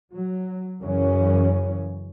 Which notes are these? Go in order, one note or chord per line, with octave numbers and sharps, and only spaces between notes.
F#3
F#2 C#3 E3 C#4